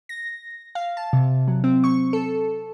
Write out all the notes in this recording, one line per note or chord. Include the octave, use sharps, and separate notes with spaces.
A#6
F5
A5
C3
F#3
C4
C#6
A4